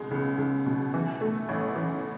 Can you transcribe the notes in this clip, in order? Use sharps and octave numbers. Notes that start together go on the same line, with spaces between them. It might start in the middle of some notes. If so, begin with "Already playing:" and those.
Already playing: C#2 B2 G#3
C#2
C#2
B2
E3
A3
A1
E3